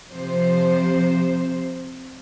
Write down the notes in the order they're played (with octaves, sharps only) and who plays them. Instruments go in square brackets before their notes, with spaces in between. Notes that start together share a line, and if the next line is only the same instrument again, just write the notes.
[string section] C3 F3 C5